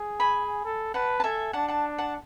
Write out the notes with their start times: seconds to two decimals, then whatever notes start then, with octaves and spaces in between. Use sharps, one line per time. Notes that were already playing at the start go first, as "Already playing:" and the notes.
Already playing: G#4
0.20 G#5 B5
0.65 A4
0.94 B4 F#5 A5
1.20 A5
1.24 A4 E5 G#5
1.53 D4 F#5 A5
1.68 F#5 A5
1.98 F#5 A5